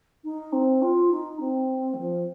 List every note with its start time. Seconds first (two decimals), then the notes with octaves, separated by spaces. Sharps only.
0.24 D#4
0.52 C4
0.82 F4
1.11 D#4
1.40 C4
1.94 D#3
1.98 F3